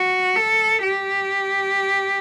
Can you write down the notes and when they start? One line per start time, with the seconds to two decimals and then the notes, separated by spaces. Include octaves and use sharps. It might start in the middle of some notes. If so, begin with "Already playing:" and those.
Already playing: F#4
0.36 A4
0.83 G4